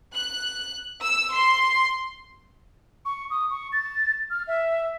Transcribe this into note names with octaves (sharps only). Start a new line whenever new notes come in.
F#6
E6
C6
C#6
D#6
C#6
A6
F6
E5